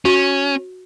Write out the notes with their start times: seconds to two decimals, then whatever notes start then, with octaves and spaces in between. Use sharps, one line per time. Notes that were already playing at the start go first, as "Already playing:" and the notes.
0.05 C#4 F#4